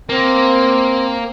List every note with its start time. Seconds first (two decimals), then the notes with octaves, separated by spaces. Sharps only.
0.09 A#3 C4